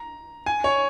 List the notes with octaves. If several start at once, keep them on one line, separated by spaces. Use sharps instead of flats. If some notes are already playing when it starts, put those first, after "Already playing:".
Already playing: A#5
G#5
C#5